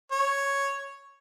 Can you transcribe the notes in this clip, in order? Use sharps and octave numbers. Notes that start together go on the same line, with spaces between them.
C#5